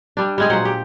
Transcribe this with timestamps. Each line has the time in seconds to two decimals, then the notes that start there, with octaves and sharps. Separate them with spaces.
0.17 G3 D4
0.38 G3 G#3 G#4
0.50 A#2 F#3 C5 F#5
0.65 G4